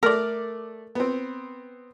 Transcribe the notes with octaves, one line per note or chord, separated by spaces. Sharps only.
A3 A#4 D5
B3 C4